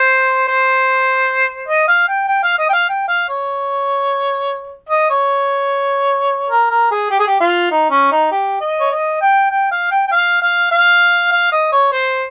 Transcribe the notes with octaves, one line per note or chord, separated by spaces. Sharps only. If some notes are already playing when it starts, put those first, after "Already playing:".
Already playing: C5
C5
D#5
F5
G5
G5
F5
D#5
G5
F5
G5
F5
C#5
D#5
C#5
A#4
A#4
G#4
G4
G#4
G4
F4
D#4
C#4
D#4
G4
D#5
C#5
D#5
G5
G5
F5
G5
G5
F5
F5
F5
F5
D#5
C#5
C5